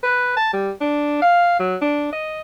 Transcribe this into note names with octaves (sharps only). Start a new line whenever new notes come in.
B4
A5
G3
D4
F5
F#3
D4
D#5